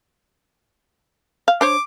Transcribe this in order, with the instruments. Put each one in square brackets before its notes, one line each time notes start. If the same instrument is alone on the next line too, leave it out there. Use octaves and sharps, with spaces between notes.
[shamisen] F5
[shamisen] D4 C5 C#5 [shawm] D6